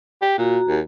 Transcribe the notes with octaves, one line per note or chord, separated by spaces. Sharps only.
G4
A#2 F#4 A#5
D#2